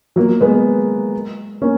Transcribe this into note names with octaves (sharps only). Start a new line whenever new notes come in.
F#3 A#3
G#3 B3
A#3 C#4